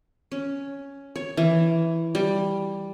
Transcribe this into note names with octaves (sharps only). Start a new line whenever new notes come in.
C#4
C#5
E3
G3